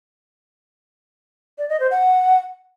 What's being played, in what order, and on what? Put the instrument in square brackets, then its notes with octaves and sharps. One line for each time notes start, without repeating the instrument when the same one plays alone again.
[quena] D5
D#5
C5
F#5